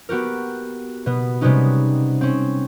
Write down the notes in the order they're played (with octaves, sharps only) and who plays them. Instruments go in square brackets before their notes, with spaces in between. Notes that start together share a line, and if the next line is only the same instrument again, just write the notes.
[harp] B3 F#4 G4 A#4
B2 B3
C3 G3 G#3 B3 C#4 D#4
C4 C#4